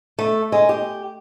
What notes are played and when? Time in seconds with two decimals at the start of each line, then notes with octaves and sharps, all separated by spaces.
0.19 A3
0.52 G#3
0.69 G4